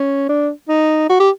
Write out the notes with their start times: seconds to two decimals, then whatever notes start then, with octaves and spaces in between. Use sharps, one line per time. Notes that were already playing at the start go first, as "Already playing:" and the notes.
Already playing: C#4
0.29 D4
0.69 D#4
1.10 F#4
1.20 G4